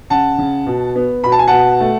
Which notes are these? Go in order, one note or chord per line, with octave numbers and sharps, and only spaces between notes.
C#3 F#5 A5
C#3
B2
B3
B2 B5
A5
G#5
B2 F#5 A5
A3